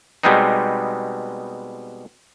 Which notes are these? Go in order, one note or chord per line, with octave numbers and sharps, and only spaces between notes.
B2 G3 G#3 B3 C4 D#4